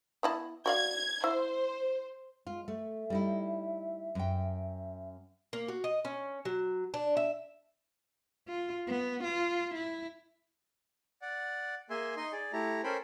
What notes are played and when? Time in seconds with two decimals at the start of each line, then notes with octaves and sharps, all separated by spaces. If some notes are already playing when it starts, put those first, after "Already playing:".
0.23 B3 E4 A5
0.66 F#4 D5 F5 G#6
1.24 E4 C5
2.47 G#3 F4
2.68 A3 E5
3.10 G3 D#4 E4
4.15 F#2 G5
5.53 A#3
5.68 F#4
5.84 D#5
6.05 C#4
6.45 F#3
6.94 D4
7.17 E5
8.48 F4
8.87 B3
9.25 F4
9.75 E4
11.22 D5 F#5
11.90 A#3 G#4 E5 G#5 C6
12.17 D#4 D#5 C6
12.33 G#4 D5
12.53 A3 E4 G4 A#5
12.84 C#4 A4 A#4 C5 G5 B5